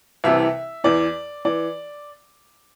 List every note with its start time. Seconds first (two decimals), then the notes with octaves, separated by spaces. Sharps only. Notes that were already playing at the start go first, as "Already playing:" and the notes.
0.24 C2 C3 E3 E5
0.84 E2 E3 D5
1.45 E3 D5